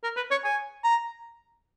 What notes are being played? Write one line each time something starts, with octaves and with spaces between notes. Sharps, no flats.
A#4
B4
C#5
G#5
A#5